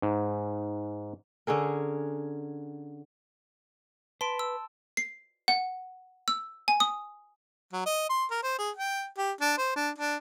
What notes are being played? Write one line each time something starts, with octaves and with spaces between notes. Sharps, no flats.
G#2
D3 C#4 G#4 A#4
B4 A5 C6 D7
E6
C7
F#5
E6
G#5
D#6
F#3
D#5
C6
A#4
C5
G#4
G5
G4
D4
C5
D4
D4